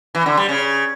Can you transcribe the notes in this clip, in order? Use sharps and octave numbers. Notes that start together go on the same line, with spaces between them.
E3
D3
G3
C#3